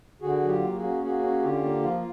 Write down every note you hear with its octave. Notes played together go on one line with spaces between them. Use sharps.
D3 F#4 G#4
F#3
F4 G4
A#3
F#4 G#4
C#4
A#3 F#4 G#4
C#4
D3 F4 G4
A#3
F3 F4